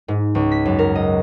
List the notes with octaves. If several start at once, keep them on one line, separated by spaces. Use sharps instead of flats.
G#2
C#2
B6
F#2
A#4
D#5